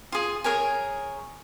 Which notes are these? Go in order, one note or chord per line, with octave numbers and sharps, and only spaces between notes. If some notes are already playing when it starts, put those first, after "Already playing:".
F4 G#4
G#4 A#4 C#5 G#5